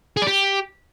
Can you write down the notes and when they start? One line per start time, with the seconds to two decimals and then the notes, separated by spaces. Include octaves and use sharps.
0.17 G#4
0.22 D5
0.27 G4